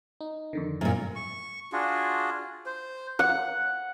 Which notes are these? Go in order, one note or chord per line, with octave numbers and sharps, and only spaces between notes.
D#4
F2 D3 D#3
F#2 A#2 A#3
C#6
D4 F4 F#4 G#4
C5
F#5